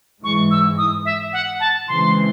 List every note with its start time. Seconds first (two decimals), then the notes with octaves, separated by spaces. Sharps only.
0.23 G#2 E3 G#3 C#6
0.51 E6
0.78 D#6
1.05 E5
1.33 F#5
1.60 A5
1.87 C#3 E3 G#3 C4 C6